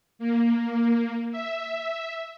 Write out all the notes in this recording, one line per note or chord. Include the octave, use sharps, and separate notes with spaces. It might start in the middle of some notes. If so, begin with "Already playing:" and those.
A#3
E5